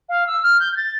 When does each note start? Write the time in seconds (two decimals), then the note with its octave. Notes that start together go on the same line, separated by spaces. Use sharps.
0.09 F5
0.27 E6
0.43 F6
0.60 G6
0.72 G6
0.77 A6